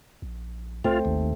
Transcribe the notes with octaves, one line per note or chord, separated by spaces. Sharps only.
A#1
C2 A3 C4 F4
G#1 D#2